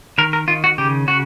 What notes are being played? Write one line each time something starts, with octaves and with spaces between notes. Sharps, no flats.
D#3 A#4
A#4
D#3 F4
F#4
C#3 G4
C#3 F#4